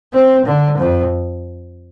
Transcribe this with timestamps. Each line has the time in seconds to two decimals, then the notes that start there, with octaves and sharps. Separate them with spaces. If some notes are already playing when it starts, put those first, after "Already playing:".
0.13 C4
0.45 D3
0.78 F2